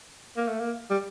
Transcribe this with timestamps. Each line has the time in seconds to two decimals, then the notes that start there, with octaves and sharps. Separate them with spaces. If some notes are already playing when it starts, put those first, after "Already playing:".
0.37 A#3
0.48 A3
0.60 A#3
0.90 G3